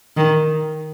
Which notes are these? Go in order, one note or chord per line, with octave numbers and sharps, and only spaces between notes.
D#3